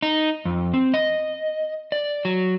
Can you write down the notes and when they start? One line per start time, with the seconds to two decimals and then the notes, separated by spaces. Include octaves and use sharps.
0.02 D#4
0.45 F2
0.74 C4
0.94 D#5
1.92 D5
2.25 F#3